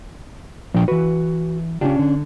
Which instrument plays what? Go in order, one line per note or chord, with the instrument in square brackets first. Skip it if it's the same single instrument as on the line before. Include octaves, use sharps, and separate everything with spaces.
[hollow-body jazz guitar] A#2 [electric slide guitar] F3 D4 G5
[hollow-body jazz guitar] E3 B4 [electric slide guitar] F#4
[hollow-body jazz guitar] C#3 F4 G4 [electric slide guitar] C#4 D4
[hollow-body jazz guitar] D3